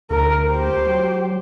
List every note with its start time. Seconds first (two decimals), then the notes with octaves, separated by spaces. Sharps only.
0.11 D2 A#4
0.49 G4 C5
0.87 F#3